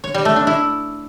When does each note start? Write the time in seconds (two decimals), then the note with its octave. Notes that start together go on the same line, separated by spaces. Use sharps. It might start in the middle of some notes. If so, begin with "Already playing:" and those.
0.04 C#5
0.14 G3
0.25 A3
0.36 D4
0.47 E4